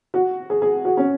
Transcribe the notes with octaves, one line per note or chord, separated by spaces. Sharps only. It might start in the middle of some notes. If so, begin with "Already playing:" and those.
F#4
G#4
G#4
F#4
C#4